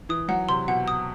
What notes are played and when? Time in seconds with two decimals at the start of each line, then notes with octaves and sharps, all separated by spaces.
0.09 E3 D#6
0.28 F#3 F#5
0.49 C3 C6
0.68 B2 F#5
0.88 D#6